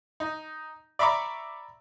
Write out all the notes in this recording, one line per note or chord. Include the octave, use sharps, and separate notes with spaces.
D#4
D5 E5 A#5 B5 C#6 D6